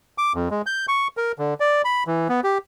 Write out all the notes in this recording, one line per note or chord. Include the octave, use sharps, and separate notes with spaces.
D6
F2
G#3
G6
C#6
A#4
D3
D5
B5
E3
B3
G4